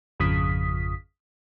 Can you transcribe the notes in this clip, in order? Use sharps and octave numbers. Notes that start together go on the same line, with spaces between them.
G#1 F2 C#3 F3 D#6 B6